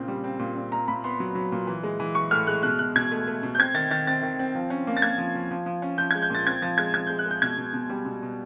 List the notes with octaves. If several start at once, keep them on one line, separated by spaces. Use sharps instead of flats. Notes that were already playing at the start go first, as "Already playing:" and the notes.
Already playing: A#2 C#3 C4
G3
C4
A#2
C4
A#2 A#5
A#2 B5
B3 C6
F#3
F#3
A#2
E3
G#3
E3
E3 C#6
A2 F6
G#3 F#6
B2 F#6
B2 F#6
B2 G#6
A3
A3
B2
G6
C4 G#6
D#3 A6
D#3 A6
C4 A6
D#3
C4
F3
C#4
A#3
A6
A#3 G#6
F3
F3
F3
F3
C#4
F3 G6
G#6
G#3
G6
A#2 A6
C4 G#6
F3 A6
G#3 G#6
F3 G#6
G#3 G6
F#6
G#3 G6
B2 G#6
B2
B2
G3
B2
B2